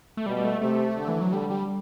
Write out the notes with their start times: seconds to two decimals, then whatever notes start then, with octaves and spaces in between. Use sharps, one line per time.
0.17 A3
0.26 B2 G3
0.37 G3
0.44 A3
0.61 C3 A3
0.97 D3
1.08 E3
1.21 F#3
1.32 D3 G3
1.50 G3